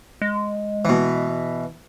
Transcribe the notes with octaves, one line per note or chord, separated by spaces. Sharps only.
G#3
B2 E3